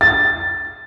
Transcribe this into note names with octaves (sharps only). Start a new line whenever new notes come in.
A6